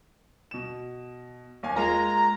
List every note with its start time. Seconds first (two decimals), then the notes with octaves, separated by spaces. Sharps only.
0.51 B2 E7
1.63 D#2 F5 G#5
1.76 G#3 A#3 F4 A#5